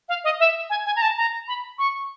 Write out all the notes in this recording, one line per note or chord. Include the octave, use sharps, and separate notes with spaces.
F5
D#5
E5
G#5
G#5
A#5
A5
A#5
B5
C#6